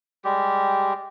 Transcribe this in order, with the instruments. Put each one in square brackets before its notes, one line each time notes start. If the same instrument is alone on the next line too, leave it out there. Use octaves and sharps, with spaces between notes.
[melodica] G3 G#3 G4